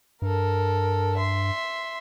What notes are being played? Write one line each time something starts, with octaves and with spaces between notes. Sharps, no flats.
G2 A4 A#4
E5 C6